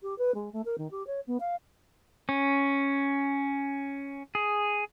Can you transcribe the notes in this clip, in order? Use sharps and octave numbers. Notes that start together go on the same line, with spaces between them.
G4
B4
G#3
A3
A#4
D#3
G4
C#5
B3
F5
C#4
G#4